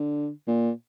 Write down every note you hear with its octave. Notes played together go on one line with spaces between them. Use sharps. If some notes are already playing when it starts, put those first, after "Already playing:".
Already playing: D3
A#2